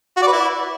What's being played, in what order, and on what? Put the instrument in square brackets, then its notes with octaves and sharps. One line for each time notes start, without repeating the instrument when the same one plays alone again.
[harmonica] F#4
D5
B4
E4